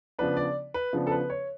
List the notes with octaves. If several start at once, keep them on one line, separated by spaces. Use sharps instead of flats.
C#3 F3 B3 D4 B4
D5
B4
C#3 F3 B3 D4
A4
B4
C#5